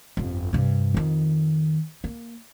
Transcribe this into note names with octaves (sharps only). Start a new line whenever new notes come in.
G1 F2
G2 C3
F2 D#3
A#3